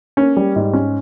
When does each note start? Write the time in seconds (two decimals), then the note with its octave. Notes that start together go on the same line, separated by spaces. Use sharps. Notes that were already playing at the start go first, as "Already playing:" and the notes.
0.17 A#3 C#4
0.37 G3
0.56 G#2
0.73 C#4